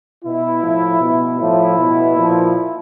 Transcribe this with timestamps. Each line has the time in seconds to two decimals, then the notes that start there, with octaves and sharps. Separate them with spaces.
0.24 B2 E4
0.62 A2 F3
1.00 B2
1.39 A2 F3 E4
1.77 B2
2.16 A#2 F3